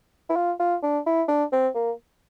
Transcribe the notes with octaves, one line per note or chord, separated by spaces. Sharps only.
E4
F4
F4
D4
E4
D4
C4
A#3